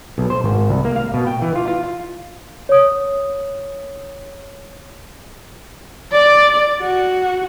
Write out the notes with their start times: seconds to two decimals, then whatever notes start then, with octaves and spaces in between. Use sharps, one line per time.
0.18 B1
0.30 C5
0.44 G#1
0.69 C2
0.85 A#3
0.96 F5
1.14 B2
1.27 G5
1.42 E3
1.56 F4
1.68 F4
2.69 C#5 D#6
6.13 D5
6.81 F#4